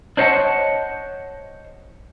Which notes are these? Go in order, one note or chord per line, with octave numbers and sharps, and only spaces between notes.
D4 C5 C#5 D#5 F#5 A5